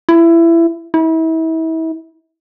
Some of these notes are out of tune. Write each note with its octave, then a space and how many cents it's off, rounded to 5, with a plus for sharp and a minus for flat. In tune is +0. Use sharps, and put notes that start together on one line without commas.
E4 +20
E4 -35